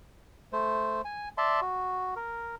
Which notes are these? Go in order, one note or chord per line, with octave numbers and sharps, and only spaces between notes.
A3 C5
G#5
D5 E5 A5 C6
F#4
A#4